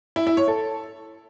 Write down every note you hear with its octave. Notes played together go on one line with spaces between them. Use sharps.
E4
E4
C#5
A4